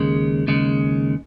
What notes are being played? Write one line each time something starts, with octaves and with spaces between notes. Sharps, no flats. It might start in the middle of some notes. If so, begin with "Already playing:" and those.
Already playing: D#2 C#3 G#3
D#2 C#3 G#3